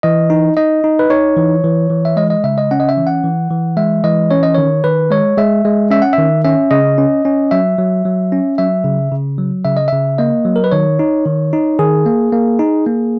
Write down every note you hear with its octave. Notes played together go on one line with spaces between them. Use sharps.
E3 D#5
D#4
D#4 D#5
D#4
B4
D#4 C#5
E3
E3
E3
E5
G#3 D#5
D#5
C#3 E5
D#5
C#4 F#5
D#5
E5
E3
F#5
E3
E3
G#3 E5
E3 D#5
C#4 C#5
D#5
D#3 C#5
D#3 B4
G#3 C#5
G#3 E5
G#3
C#4 E5
F#5
E5
D#3
C#4 E5
C#3 D#5
C#4
C#4
F#3 E5
F#3
F#3
C#4
F#3 E5
C#3
C#3
F#3
C#3 E5
D#5
C#3 E5
A#3 D#5
F#3
A#4
B4
D#3 C#5
D#4
D#3
D#4
D#3 G#4
A#3
A#3
D#4
A#3